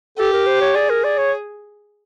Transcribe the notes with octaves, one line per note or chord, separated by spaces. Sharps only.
G4 A4
A#4
C5
C#5
G#4 D5
A#4
D5
C#5